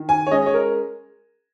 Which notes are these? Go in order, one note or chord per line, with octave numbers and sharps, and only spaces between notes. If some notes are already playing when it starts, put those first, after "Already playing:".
Already playing: D#3
G#5
C#5
G#3 C#4 D#5
C#5
A#4